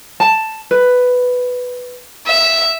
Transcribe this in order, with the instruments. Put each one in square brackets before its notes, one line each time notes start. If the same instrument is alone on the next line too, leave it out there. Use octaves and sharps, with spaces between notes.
[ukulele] A5
B4
[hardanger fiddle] E5